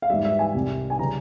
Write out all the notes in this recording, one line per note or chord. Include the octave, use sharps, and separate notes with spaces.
F5
G#2 G3 E5
E5
G#5
C2 C3 G3
G#5
C#3 G3 A#5